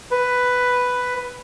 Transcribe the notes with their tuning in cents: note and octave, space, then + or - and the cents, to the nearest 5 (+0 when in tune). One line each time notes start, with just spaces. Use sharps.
B4 +5